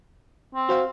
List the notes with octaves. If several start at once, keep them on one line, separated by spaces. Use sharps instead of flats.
C4
F#4 C5 F5